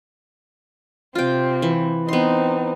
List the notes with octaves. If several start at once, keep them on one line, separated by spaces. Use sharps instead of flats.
C3 C4 F4 G5
E3
B3 C4 D#4 C6